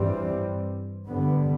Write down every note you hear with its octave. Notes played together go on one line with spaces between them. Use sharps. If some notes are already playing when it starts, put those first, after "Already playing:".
Already playing: G2 E3 G3 C4
G2 D3 G3 B3